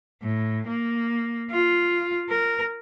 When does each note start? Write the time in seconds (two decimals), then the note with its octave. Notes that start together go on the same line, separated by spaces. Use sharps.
0.23 A2
0.67 A#3
1.51 F4
2.29 A#4